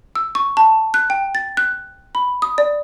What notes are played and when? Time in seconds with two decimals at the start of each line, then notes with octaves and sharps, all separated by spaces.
0.16 E6
0.35 C#6
0.57 A5
0.94 F#6
1.10 G5
1.35 A6
1.57 F#6
2.15 B5
2.42 D#6
2.58 D5